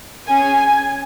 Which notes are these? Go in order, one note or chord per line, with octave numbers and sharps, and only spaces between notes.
C#4 G#4 G#5